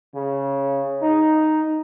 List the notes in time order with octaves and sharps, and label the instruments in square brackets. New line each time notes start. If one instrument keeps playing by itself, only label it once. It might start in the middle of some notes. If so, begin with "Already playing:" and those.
[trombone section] C#3
D#4